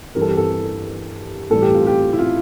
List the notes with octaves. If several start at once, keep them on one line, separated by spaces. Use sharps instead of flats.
G2 E3 G3 A#4
A4
G4
A4
A2 E3 G3 A4
G4
F4
G4
E4
F4